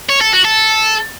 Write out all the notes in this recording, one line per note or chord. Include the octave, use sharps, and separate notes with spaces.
C#5
A4
F#4
A4